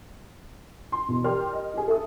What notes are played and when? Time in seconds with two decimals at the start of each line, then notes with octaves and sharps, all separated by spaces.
0.92 C6
1.08 E2 B2
1.24 G4 A#4 D5 G5 C6 F6
1.53 D#5
1.74 G4 G#4
1.88 A4 E5 D#6